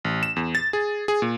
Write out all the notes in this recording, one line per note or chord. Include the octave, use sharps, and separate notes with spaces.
A1
E7
E2
A6
G#4
G#4
A#2